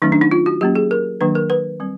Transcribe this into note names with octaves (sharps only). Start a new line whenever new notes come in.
D#3 F#3 A3 C#4 D#4
D4
D#4
F4
F#4
F#3 A#3 C#4 G4
G#4
A#4
D#3 F#3 A#3 D4 B4
A#4
B4
G3 C4